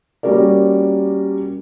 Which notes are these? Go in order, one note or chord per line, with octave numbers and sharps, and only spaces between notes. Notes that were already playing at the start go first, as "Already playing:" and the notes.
G3 A#3 C#4 F#4 A#4 D5